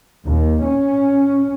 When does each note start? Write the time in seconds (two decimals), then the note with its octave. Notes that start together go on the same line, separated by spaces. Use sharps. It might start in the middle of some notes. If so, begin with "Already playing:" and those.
0.25 D#2
0.62 C#4